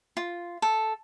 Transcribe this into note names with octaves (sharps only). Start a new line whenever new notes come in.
F4
A4